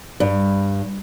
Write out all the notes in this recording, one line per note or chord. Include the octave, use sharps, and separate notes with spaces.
G2